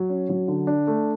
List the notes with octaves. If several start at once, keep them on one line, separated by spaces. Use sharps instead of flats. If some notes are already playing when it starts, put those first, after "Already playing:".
Already playing: F#3
C#4
F#3
D3
D4
A3